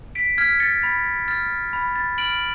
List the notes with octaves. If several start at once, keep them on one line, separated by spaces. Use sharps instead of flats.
B6 D7
F6 G#6 B6
A6 C#7
B5 A6
F6 A6
B5
A6
F6 D7 F#7